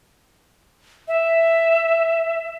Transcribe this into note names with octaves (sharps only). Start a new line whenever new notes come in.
E5